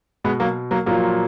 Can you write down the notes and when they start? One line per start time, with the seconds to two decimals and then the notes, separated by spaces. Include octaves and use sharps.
0.24 B2 G#3 B3
0.40 F#3 A#3
0.71 F#3 A#3
0.86 A#2 F3 F#3 A#3